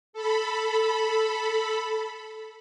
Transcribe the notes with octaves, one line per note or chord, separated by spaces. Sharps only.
A4 B5